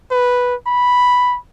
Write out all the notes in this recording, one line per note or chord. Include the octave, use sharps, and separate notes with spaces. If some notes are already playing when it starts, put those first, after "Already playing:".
B4
B5